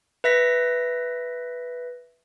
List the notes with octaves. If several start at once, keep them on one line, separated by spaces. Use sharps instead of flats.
B4 E5 A#6 B6